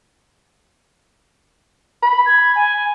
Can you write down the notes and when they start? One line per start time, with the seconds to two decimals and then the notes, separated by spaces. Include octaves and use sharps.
2.03 B5
2.26 G#6
2.56 G#5